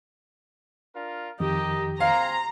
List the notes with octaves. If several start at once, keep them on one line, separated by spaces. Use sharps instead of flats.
D4 F4 A#4
F2 D#3 G4 A#4 D#5
C4 F5 G#5 A#5 C6